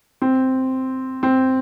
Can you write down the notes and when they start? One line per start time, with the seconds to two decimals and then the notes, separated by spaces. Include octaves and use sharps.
0.22 C4
1.23 C4